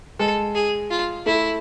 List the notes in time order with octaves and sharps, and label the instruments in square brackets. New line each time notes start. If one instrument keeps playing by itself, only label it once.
[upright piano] G#3 [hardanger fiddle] A4
[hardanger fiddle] G#4
F4
[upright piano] A3 [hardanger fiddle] E4